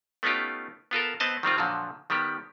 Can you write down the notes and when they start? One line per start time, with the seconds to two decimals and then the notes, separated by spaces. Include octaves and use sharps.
0.23 A3 B3 C#4 D#4 F4 G4
0.91 B3 F4 A4 A#4
1.20 B3 C4 D#5 A5
1.43 D#3 G3 C4 F4
1.58 A#2 D3 F3 F#3
2.10 D#3 G3 B3 G4